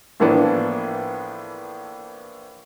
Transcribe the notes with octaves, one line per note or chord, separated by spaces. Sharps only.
A2 E3 F3 A#3 B3 D4